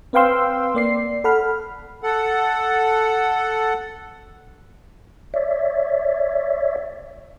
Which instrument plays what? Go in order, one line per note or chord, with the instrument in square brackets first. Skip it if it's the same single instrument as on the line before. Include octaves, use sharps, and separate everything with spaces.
[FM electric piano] C4 B4 F5 G5 C6 E6
A#3 D5 C7
A4 F#5 B5 F6
[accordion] A4 F#5
[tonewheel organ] C#5 D5 E5